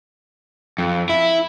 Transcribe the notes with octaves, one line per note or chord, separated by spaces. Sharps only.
F2
E4